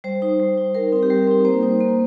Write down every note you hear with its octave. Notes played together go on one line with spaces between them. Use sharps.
G3 C5
D#4
G3
D#4
G3 A#4
C4 D#4
G4
G3 A#4
C4 D#4
A#3 C5
D#4
A#3